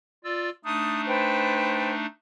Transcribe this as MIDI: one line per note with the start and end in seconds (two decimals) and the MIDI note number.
0.24 0.50 65
0.24 0.50 74
0.24 0.50 88
0.65 2.06 57
0.65 2.06 62
0.65 2.06 63
0.65 1.01 87
1.07 1.93 71
1.07 1.93 72
1.07 1.93 79